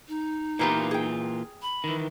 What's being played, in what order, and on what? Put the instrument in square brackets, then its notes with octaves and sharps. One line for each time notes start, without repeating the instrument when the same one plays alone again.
[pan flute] D#4
[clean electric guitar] A#2 E3 F4 [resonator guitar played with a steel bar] A#3 B3 G4
[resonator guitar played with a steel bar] G#4 G5
[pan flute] B5
[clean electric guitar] D#3 E3